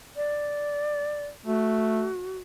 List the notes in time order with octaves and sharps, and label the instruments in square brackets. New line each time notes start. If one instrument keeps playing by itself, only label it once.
[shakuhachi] D5
[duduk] A3 [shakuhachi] F#4